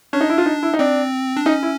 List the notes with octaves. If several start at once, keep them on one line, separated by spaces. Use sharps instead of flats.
C#4 D4
D#4
E4
F4
D#4
E4
D#4
C4 D4
D4
C#4 D#4
E4